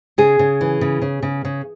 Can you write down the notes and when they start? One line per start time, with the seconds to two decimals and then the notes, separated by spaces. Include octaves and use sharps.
0.18 C#3 G#4
0.39 C#3
0.61 E3
0.81 C#3
1.02 C#3
1.23 C#3
1.45 C#3